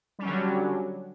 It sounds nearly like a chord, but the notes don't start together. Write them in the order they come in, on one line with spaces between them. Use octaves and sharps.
G3 C#4 F#3 D3 D4